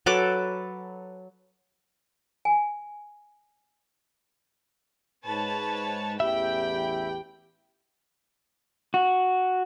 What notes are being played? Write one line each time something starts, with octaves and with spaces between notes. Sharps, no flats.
F#3 A4 B4 D6
G#5
G#2 B4 C#5 A5
A1 E2 G4 E5 G5 B5
F#4